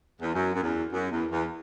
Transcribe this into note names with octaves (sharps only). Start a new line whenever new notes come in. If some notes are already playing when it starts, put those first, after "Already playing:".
E2
F#2
F#2
E2
F#2
E2
E2